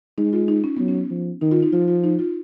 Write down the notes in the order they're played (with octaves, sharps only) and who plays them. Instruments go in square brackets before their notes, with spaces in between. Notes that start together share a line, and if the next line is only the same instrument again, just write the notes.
[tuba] G#3 [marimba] D#4
[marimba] F4
D#4
C#4
[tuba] F#3 [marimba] B3
[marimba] C#4
[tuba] F3
[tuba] D#3 [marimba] D#4
[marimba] F4
D#4
[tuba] F3 [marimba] F4
[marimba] F4
D#4
F4